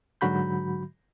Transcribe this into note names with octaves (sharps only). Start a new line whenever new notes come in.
G#2 D3 F#3 F#4 B5 G6